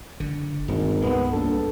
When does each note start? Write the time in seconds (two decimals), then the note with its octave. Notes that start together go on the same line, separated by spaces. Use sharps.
0.20 F#1 D3
0.68 D#1 G#1 G2
1.02 C2 G#3 B3
1.32 A#1 A4